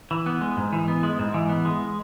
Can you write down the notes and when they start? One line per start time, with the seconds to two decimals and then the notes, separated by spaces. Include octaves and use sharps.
0.11 E3
0.26 B3
0.41 G#3
0.57 G#2
0.73 E3
0.88 B3
1.03 G#3
1.19 G#2
1.34 E3
1.49 B3
1.65 G#3